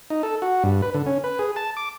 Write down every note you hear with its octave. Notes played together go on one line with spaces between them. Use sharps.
D#4
A4
F#4
G2
B4
D3
C#4
B4
G#4
A5
D6